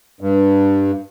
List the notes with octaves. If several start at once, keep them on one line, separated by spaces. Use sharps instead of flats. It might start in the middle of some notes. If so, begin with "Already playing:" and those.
G2